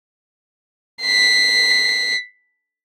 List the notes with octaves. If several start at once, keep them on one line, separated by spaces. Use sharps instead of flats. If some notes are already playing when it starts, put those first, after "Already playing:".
B6 C7